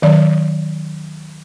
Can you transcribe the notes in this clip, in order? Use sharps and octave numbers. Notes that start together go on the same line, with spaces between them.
D#3 F#3 D5